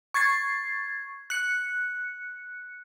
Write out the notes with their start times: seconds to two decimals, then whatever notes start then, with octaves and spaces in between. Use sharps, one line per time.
0.14 C#6 G#6 A6 C7
1.30 F#6 C#7